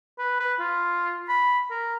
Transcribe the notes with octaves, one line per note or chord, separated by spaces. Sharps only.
B4
B4
F4
B5
A#4